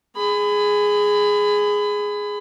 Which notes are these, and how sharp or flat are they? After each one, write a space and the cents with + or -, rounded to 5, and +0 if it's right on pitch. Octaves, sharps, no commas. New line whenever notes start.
G#4 +0 B5 +30